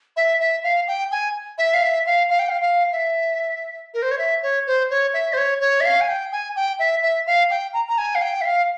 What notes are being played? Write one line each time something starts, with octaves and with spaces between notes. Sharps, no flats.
E5
E5
F5
G5
G#5
E5
F5
E5
F5
F5
G5
F5
F5
E5
A#4
C5
C#5
E5
C#5
C5
C#5
E5
C5
C#5
C#5
E5
F5
G#5
G5
G#5
G5
E5
E5
F5
G5
A#5
A#5
G#5
F5
G5
E5
F5